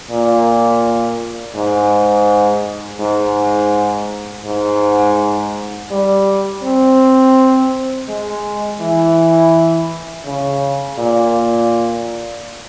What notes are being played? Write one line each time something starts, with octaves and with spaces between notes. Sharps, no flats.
A#2
G#2
G#2
G#2
G3
C4
G#3
E3
C#3
A#2